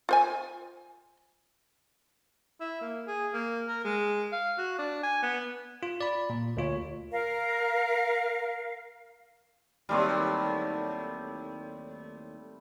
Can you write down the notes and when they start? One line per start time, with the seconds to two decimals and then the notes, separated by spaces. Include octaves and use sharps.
0.09 F4 C5 G#5
2.60 E4
2.81 A#3
3.07 G#4
3.33 A#3
3.68 A#4
3.84 G#3
4.32 F5
4.58 F#4
4.78 D4
5.03 G#5
5.22 B3
5.83 F4
6.01 D5 B5
6.30 A#2
6.57 D2 F4 C#5
7.10 A#4 F5
9.89 D#2 A2 F#3 G3 A3 C4